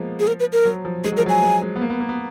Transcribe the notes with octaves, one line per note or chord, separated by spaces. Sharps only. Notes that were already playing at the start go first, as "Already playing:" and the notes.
Already playing: F3 G#3 A#3 B3
G#4
A#4
B4
A#4
F#3
F3
G#3 G#4
F#3
F3 A#4
F#3 G#5
G#3
G#3
B3
A#3
B3
A#3
B3